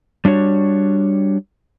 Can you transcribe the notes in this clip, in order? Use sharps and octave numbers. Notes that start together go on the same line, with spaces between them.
G3 D4 F#4 C#5